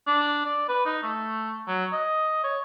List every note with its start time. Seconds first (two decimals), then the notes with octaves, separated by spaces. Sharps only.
0.07 D4
0.46 D5
0.68 B4
0.85 D#4
1.03 A3
1.68 F#3
1.93 D#5
2.44 C#5